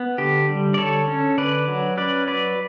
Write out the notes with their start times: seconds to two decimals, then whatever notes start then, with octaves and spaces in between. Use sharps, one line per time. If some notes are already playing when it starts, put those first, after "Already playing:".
Already playing: B3
0.18 D3 G4
0.49 G3
0.74 D5
0.78 D3 A4 C#5
1.08 C#4
1.37 D3 B4 D5
1.68 F#3
1.97 C#4 B4 D5
2.27 F#3 B4 D5